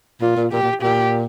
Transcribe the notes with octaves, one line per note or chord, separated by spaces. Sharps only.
A#2 F4
A#2
A#2 G4
A#2
A#2 G4